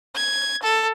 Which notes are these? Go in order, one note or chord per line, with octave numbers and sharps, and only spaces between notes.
G#6
A4